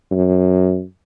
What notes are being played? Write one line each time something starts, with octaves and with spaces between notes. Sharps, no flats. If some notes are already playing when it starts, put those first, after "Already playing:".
F#2